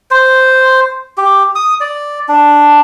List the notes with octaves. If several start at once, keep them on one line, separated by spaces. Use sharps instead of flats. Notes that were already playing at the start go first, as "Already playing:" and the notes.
C5
G4
D#6
D5
D4